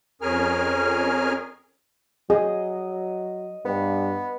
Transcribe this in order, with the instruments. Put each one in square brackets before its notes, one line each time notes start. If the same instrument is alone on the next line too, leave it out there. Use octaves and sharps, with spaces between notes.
[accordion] F2 C#4 G#4 A#4 G#5 F6
[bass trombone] F#3 [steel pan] G#4 [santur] D#5
[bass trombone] G2 [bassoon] B3